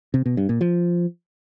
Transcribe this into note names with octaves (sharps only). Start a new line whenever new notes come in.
C3
B2
G2
A#2
F3